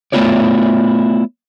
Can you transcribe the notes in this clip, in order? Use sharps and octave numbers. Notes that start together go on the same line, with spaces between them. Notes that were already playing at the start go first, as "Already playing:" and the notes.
A3 B3 E4 F4 C#5 D5